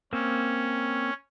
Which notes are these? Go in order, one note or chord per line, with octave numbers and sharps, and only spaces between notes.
A#3 C4 C#4